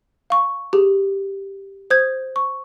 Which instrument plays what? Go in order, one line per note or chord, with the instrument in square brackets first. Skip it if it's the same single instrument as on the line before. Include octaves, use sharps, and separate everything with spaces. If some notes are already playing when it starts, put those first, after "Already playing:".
[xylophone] F5 C#6
G4 G#4
C5 D#6 G6 G#6
C#6